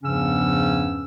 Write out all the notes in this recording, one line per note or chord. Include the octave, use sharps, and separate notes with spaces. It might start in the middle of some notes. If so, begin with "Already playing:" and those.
E2 G2 C#3 F3 C#4 E6